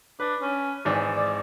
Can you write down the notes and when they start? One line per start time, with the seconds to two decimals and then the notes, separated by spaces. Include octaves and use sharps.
0.20 D4 B4
0.42 C#4
0.85 G#1 G#2 E3 D5
1.16 D5